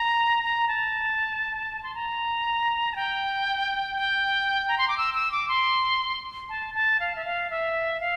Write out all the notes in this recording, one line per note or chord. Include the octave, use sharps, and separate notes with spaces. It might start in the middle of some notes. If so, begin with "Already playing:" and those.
Already playing: A#5
A#5
A5
C6
A#5
A5
G5
G5
A#5
C6
D6
E6
E6
D6
C6
A5
A5
F5
E5
F5
E5
F5